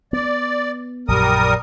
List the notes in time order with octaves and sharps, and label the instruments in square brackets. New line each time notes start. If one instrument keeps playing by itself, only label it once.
[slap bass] B3 [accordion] D5
[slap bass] A#1 F#2 [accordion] G3 A#4 D#6